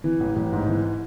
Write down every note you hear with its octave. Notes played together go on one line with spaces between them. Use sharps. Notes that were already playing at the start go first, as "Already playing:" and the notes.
E3
A1
A1
G#2
E3